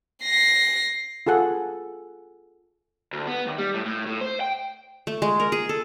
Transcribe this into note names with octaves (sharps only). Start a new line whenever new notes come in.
A#6 C7
F4 G#4 A4 F#5
D2
B3
D#2
G3
A2
A2
A2
C5
G5
A3
G#3
A#4
G#4
A4